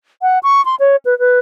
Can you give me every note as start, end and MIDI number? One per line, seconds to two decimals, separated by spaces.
0.22 0.39 78
0.43 0.64 85
0.65 0.75 84
0.80 0.96 73
1.05 1.18 71
1.19 1.39 71